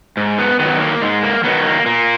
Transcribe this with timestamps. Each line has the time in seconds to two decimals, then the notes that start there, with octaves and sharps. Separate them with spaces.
0.17 G#2
0.38 B3
0.59 D#3 F#3 B3
0.80 A#3
1.01 G#2 G#3
1.23 A#3
1.44 D#3 F#3 B3
1.65 A#3
1.86 A#2 A#3